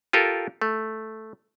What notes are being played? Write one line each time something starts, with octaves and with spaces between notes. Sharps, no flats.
F4 G4 A4 A#4
A3